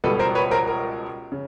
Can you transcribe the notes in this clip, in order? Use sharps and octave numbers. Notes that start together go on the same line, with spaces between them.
C#2 B2 G3 A4 B4
A#4 C5
B4 C#5
A#4 C5
A#4
C#3